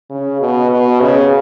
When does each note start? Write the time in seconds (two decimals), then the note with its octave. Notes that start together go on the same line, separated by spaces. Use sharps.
0.10 C#3
0.41 B2
0.71 B2
1.02 C#3